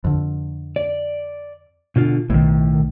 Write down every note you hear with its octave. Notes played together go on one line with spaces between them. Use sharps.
F2 D3
D5
B2 D3 F4
B1 A2 D#3